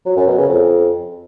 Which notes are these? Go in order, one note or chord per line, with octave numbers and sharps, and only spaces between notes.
F#3
F#2
B2
C#3
F2